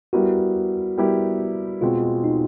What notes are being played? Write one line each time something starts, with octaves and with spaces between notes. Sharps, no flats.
G3 B3 E4 F#4 G4 A#4
G3 B3 E4 G4 A#4
B2 G#3 C4 F4
D#4